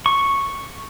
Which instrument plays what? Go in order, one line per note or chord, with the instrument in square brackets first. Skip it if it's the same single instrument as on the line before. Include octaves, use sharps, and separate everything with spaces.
[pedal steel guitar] C#6